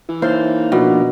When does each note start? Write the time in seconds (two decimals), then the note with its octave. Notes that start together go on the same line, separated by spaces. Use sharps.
0.09 E3 E4
0.22 A#3 D#4 C5 C#5 E5 F5
0.72 B2 F3 A#3 D4